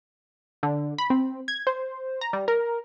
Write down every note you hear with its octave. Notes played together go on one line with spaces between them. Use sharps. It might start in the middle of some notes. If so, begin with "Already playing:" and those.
D3
B5
C4
G#6
C5
A#5
G3
A#4